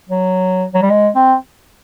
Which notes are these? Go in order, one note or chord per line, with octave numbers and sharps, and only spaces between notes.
F#3
F#3
G3
G#3
C4